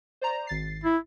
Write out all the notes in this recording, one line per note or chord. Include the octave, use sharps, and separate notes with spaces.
C5 D5 A#5
G#1 A6 C7
E4